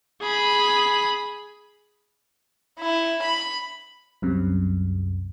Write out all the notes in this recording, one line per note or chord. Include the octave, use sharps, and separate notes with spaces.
G#4 B5
E4
B5
C2 F#2 C3